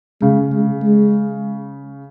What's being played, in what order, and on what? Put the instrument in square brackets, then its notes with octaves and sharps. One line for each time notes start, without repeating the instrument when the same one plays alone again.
[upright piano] C#3 [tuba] G#3
[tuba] G#3
G#3